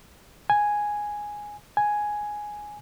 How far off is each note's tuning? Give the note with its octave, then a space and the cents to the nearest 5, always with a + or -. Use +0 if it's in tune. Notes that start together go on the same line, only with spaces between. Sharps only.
G#5 +0
G#5 +5